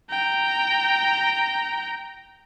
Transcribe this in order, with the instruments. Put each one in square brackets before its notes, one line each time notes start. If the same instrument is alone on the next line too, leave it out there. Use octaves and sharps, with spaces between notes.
[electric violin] G5 A#5